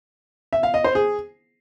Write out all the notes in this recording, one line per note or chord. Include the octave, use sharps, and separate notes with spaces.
E5
F5
D#5
C5
G#4